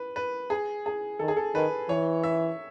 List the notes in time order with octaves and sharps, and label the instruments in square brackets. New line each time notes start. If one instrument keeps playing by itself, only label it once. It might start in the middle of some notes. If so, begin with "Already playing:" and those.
Already playing: [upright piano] B4
B4
G#4
G#4
[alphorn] D#3 [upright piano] A4
[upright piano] G#4
A4
[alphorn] D#3 [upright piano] B4
[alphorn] E3 [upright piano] C#5
[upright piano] E5